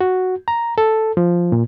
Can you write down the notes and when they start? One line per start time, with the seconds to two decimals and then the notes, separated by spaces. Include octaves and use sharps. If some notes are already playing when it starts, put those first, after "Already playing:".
0.01 F#4
0.48 A#5
0.78 A4
1.17 F3
1.52 A#2